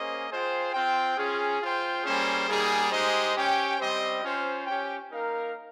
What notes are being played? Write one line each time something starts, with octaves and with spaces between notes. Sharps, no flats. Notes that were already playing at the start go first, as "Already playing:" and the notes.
Already playing: A#3 C#4 G#4 C5 D#5
F4 G#4 C5 G5
C4 F4 C5 G5
C#4 F4 G#4
F4 C5 G5
G3 A#3 C#4 G#4 C5
G3 A#3 D#4 G#4
G#3 D#4 G4 C5 D#5
C#4 G4 C#5 G5
G3 C4 G4 C5 D#5
C#4 F4 C5
C#4 G4 C#5 G5
A#3 D#4 A#4 F5